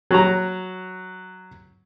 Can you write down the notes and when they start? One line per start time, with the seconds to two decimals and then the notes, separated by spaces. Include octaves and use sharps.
0.11 F#3 A#5